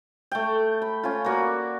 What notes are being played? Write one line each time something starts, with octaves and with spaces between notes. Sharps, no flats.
A3 G5
B5
C#4 F4
A#3 F#4 D5